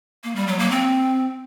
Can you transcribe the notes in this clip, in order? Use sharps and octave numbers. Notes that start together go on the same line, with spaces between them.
A#3
G3
F#3
A#3
C4